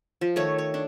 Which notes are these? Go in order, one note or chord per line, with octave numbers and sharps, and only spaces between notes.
F3
D#3 A3 C#5
C#5
D4